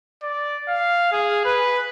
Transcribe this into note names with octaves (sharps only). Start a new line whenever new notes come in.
D5
F5
G#4
B4